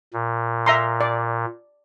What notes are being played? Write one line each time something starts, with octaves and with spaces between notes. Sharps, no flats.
A#2
E5 A#5 C6
D5